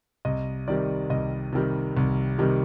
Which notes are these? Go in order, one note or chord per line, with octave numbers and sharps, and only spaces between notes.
C2 D#5
C3 D#3 G3 D5
C2 D#5
C3 D#3 G3
C2
C3 D#3 G3